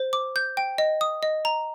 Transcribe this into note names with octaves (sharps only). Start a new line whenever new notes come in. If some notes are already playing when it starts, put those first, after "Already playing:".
Already playing: C5
D6
G6
G5
D#5
D#6
D#5
A#5